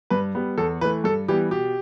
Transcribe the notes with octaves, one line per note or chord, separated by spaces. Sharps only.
G2 B4
G3 B3
E2 A4
E3 A3 B4
G2 A4
E3 G3 B3 G4
B2 G4